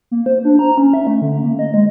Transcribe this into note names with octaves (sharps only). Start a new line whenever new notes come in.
A#3
C5
D4
A#5
C#4
E5
A3
D3
A#3
D#5
G#3